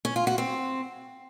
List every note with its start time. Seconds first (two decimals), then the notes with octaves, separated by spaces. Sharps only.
0.05 C#4
0.16 F4
0.27 F#4
0.38 C4